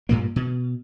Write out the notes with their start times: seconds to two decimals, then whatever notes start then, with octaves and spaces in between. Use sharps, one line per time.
0.09 G2 A#2 A#3
0.36 B2